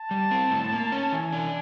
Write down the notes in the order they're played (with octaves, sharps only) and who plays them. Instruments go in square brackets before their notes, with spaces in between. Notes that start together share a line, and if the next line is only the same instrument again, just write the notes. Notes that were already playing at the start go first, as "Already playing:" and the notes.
Already playing: [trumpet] A5
[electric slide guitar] G3
C4
A2
A#3
C#4
[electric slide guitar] E3 [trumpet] G#5
[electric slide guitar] D4